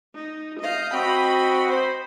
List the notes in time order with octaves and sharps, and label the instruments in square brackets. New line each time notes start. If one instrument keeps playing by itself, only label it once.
[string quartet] D#4
D#5 F5 G6
[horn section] C4 F#4 [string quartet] D#5 B5
[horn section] C5